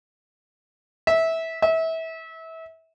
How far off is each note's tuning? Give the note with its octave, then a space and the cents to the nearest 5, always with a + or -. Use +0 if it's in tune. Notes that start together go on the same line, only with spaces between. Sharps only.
E5 -15
E5 -25